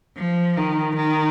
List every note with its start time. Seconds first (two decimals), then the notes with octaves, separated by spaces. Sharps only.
0.18 F3
0.57 D#3
0.97 D#3